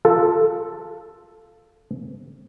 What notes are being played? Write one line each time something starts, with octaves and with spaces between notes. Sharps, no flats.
F4 A4